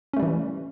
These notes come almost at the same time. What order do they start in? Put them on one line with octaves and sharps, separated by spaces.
C#4 A3 G3 E3